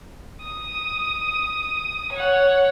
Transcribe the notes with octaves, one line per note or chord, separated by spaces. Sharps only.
D#6
C#5 F#5